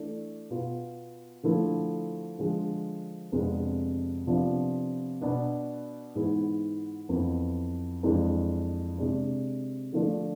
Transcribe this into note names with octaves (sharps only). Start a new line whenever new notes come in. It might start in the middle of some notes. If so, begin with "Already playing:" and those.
Already playing: E3 A3 D4
B2 B3 F4
D3 F3 A3 E4
D3 F3 G#3
F2 C3 G#3 B3 D4
C3 F3 B3 D4 F4
B2 B3 D4
G#2 E3 G#3 B3 E4
F2 E3 B3 E4
F2 E3 G#3 D4
C3 G#3 D4
D3 F3 A3 D4 F4